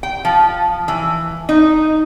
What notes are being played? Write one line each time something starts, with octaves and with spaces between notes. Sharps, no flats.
G5
F3
E3
D#4